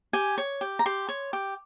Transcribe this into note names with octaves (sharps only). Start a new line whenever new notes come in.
G4 G#5
C#5
G4
A#5
G4 C6
C#5
G4